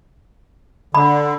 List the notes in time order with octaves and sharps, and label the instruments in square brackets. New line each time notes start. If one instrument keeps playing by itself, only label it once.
[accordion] D3 [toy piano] B5